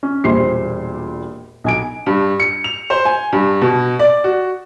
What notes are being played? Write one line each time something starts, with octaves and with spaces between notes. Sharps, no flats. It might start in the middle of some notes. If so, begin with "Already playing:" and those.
C#4
E1 A#2 G3 C5 C6 C7
B1 G#5 D7
G2
C#7
F7
C5
G#5
G2
B2
D5
F#4